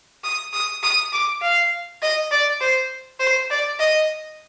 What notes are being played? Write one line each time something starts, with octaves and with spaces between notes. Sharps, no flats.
D#6
D#6
D#6
D6
F5
D#5
D5
C5
C5
D5
D#5